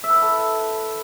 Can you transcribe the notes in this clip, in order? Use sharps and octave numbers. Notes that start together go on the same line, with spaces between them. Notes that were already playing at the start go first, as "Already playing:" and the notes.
E5
B4
E4
A4